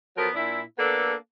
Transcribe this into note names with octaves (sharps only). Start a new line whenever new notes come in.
F3 F#3 B3 A4 A#4
A#2 D4 E4
A#3 B3 D4 A4